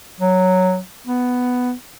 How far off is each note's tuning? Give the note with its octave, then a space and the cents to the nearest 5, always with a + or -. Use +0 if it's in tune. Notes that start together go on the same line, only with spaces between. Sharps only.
F#3 +0
B3 +5